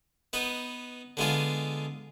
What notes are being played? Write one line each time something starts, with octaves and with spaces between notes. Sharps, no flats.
B3 D#4 B4
D3 G#3 B3 F4 G#4